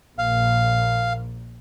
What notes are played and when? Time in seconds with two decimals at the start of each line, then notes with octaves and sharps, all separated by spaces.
0.18 A#1 A#2 F5